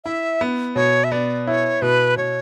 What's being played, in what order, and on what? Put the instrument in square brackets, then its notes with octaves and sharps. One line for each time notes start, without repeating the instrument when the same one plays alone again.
[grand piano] E4 [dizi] E5
[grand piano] B3
[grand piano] B2 [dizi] C#5
[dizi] E5
[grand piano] B3 [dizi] D5
[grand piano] E4 [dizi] C#5
[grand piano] B2 [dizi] B4
[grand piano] B2 [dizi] C#5